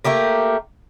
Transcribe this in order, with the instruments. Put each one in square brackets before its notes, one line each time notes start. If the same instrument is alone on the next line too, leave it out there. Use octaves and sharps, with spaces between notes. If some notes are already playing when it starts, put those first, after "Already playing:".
[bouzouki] A3 A#3 G4 A#4